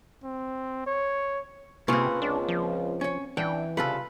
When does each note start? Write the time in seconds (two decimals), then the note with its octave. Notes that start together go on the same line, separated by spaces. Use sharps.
0.24 C4
0.87 C#5
1.88 C3 A#3 C4 C#4 F4 G#4 B4
2.22 C#2 D4
2.49 F3
3.01 C#4 C#5
3.37 E3 D4 F#5 G5
3.77 C2 C#3 F4 A4 B4